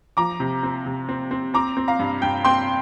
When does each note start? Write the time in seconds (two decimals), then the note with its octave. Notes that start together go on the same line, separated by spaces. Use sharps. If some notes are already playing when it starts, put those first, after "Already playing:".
0.17 F3 A#5 D6
0.40 C3
0.63 C4
0.86 C3
1.09 C4
1.31 C4
1.54 C4 A#5 D6
1.77 C4
1.88 F5 A#5
1.99 G2
2.22 G2 G5
2.45 C4 G5 C6